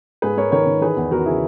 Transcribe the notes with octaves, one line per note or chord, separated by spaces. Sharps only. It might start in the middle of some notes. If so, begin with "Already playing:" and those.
G#2 G#4 B4
G#2 A#4 C#5
D#3 A#4 C#5
D#3
E3 G#4 B4
E2
E2 F#4 A#4
C#3 E4 G#4